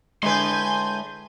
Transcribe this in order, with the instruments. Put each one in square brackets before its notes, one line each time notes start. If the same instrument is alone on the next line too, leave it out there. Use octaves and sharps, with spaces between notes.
[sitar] A2 D3 B4 [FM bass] G#3 [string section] G#5 G6 [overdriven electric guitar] C6